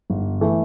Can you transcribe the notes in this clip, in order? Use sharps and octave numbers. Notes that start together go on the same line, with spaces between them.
G1
E3 A3